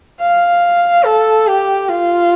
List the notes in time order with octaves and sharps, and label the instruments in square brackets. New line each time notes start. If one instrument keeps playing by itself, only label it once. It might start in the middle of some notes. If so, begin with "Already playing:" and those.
[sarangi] F5
A4
G4
F4